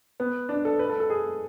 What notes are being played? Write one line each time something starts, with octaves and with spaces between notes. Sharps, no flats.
B3
D4
A4
B4
A4
A4
G#4